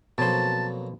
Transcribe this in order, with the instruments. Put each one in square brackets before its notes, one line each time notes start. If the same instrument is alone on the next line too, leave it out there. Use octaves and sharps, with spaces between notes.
[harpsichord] F2 F#3 A#3 [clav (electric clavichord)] B2 C5 [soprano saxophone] A5